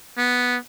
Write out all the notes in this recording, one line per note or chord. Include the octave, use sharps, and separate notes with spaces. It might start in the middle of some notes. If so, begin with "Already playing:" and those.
B3